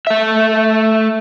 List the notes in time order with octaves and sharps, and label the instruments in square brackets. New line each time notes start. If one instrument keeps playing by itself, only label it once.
[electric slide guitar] A3 E5